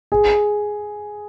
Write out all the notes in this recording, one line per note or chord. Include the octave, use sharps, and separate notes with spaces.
G#4